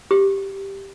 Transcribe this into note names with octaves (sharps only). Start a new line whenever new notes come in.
G4